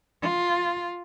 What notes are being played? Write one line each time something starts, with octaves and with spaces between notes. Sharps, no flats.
F4